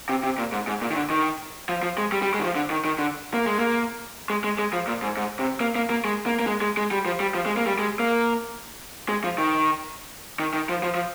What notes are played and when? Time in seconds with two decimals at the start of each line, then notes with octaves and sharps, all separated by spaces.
0.09 C3
0.23 C3
0.38 A#2
0.52 G#2
0.67 G#2
0.81 A#2
0.91 D#3
0.96 D3
1.10 D#3
1.69 F3
1.83 F3
1.98 G#3
2.12 G3
2.22 G3
2.34 G#3
2.39 D#3
2.44 F3
2.55 D3
2.70 D#3
2.85 D#3
2.99 D3
3.34 A#3
3.47 G#3
3.60 A#3
4.30 G#3
4.44 G#3
4.59 G#3
4.73 F3
4.87 A#2
5.02 G#2
5.17 G#2
5.39 C3
5.61 A#3
5.75 A#3
5.90 A#3
6.05 G#3
6.26 A#3
6.39 A#3
6.47 G#3
6.62 G#3
6.77 G#3
6.91 G3
7.05 F3
7.20 G3
7.35 F3
7.46 G#3
7.57 A#3
7.67 G3
7.79 G#3
7.99 A#3
9.09 G#3
9.24 F3
9.38 D#3
10.39 D#3
10.54 D#3
10.69 F3
10.83 F3
10.95 F3